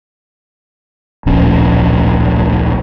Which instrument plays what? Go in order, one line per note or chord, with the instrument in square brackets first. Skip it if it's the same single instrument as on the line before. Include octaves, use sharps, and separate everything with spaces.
[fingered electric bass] D1 A#1 C#4